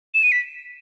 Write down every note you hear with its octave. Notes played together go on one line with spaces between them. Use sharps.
E7
D#7
B6